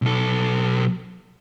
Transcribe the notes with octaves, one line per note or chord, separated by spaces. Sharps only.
B1 A4